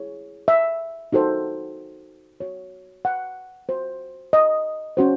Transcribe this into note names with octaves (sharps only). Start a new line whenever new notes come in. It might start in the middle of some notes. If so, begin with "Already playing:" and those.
Already playing: E4 G#4 C#5
E5
D#4 F#4 A4 C5
F#4 C#5
F#5
F#4 C5
D#5
C#4 F#4 C5